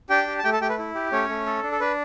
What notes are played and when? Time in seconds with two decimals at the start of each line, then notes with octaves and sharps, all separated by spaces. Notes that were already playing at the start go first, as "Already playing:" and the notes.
0.10 D4 G4 G5
0.27 G4
0.39 A5
0.44 A3 G4 G5
0.53 A4 A5
0.61 A3 G4 G5
0.69 B4
0.79 E4
0.95 G4
1.12 A3 C#4 C#5
1.29 A3
1.46 A4
1.63 D4
1.72 A4
1.80 D4 B4